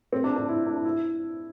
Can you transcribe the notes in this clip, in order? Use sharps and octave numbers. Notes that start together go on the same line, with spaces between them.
C4
D4
D4
E4
D4
E4
E4